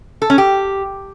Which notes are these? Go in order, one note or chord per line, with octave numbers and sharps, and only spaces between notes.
A4
C#4
G4